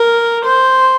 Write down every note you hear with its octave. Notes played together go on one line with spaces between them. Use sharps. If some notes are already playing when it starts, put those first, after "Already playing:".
Already playing: A#4
C5